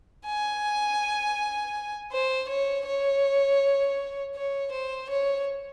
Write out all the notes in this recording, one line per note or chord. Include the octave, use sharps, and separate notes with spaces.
G#5
C5
C#5
C#5
C#5
C5
C#5